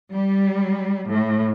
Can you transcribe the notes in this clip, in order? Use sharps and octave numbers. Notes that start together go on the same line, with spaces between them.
G3
A2